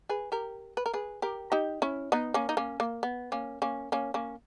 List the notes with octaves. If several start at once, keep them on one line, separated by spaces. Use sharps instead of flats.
G#4 B4
G4 A#4
B4
A#4
G#4 B4
G4 A#4
D#4 G4
C#4 E4
B3 D#4
A#3 C#4
D#4
A#3 C#4
A#3
B3
A#3 C#4
A#3 C#4
A#3 C#4
A#3 C#4